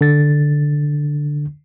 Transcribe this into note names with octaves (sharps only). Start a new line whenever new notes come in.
D3 A6